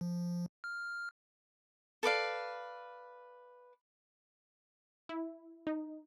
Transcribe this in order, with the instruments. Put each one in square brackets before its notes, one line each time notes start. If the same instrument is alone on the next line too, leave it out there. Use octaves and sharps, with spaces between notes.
[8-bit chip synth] F3
F6
[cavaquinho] A4 B4 D5 F5
[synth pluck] E4
D#4